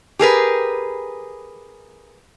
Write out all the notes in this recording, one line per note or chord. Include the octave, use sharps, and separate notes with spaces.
G4 G#4 A#4 B4